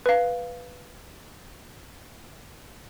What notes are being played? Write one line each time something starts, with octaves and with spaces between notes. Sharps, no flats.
B4 F5